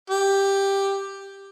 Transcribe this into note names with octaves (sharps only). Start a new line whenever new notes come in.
G4